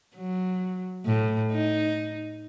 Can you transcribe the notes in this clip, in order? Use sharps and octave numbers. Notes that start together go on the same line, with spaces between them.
F#3
A2
D#4